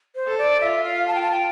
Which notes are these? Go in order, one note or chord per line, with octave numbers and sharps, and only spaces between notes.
C5
A4
D5
F4 E5
F5
A5
G5
A5
G5